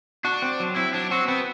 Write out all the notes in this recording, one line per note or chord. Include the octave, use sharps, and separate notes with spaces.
D4 F#4
C4
F#3
C4 E4
F#3 D4
C4 F#4
B3 C4